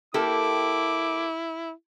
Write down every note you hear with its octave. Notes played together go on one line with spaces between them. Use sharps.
A#3 E4 G4 A4 D6